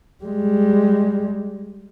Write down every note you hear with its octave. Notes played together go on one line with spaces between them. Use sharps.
G3 G#3